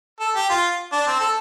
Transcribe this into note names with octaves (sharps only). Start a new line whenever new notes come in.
A4
G4
F4
D4
C4
A4